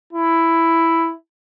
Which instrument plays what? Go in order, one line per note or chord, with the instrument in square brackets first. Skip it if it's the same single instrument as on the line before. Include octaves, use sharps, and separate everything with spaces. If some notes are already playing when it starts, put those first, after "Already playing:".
[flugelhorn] E4